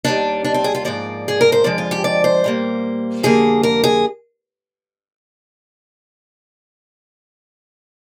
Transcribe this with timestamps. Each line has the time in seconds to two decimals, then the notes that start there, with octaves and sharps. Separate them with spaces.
0.05 D#2 D#3 G3 D4
0.44 D4
0.54 C4
0.64 G#4
0.75 F4
0.85 G#2 F3 A#3 D5
1.28 G#4
1.41 A#4
1.52 C5
1.64 F2 D3 F3 G#3 D5
1.78 F4
1.91 G4
2.04 D5
2.24 C5
2.44 A#2 G3 A#3
3.23 F2 D3 G3 A#3 G#4
3.63 A#4
3.84 G#4